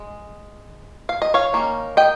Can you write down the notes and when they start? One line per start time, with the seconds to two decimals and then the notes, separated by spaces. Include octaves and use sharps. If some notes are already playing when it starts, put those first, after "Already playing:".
Already playing: G#3
1.09 F5
1.22 D#5
1.34 C#5 F5
1.53 D#3 A#3 C#4
1.97 D#5 G5